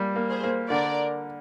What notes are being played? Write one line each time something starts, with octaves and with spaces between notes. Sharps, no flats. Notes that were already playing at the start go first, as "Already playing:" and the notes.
Already playing: G3 A#3
A#3
G#4 C5
A#3
D3 A#4 D5